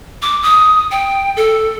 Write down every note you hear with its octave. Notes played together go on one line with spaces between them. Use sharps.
D6
D#6
G5
A4